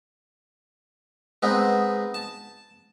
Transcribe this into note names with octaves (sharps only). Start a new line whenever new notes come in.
G#3 B3 C4 D#4
A5